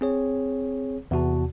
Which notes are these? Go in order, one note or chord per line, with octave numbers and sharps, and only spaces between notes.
C4 G#4 C#5
E2 C3 F#4 A5